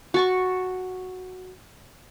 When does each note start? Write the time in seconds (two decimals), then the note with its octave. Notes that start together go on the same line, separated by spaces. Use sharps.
0.14 F#4 A5 C#6